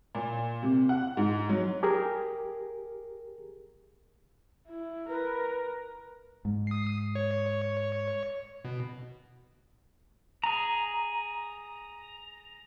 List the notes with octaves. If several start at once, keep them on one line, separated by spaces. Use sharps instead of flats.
A#2
C3
F#5
G#2
F#3
G4 G#4 A#4
E4
A#4 B4
G#2
D#6 C7
C#5
B2
G#4 A#5